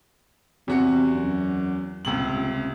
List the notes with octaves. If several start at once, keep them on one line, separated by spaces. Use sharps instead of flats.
E2 C3 F#4 C#7
F#2
D#1 C#2 C3 F#7